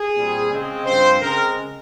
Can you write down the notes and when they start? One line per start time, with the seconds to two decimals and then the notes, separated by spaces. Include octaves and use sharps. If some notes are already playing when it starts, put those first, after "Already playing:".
Already playing: G#4
0.16 A#2 G3 C4
0.51 C#3 G#3 C4
0.86 G2 F3 C4 C5
1.21 C#3 G#3 C4 A#4